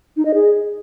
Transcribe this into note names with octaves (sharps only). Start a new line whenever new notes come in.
D#4
D#5
G#4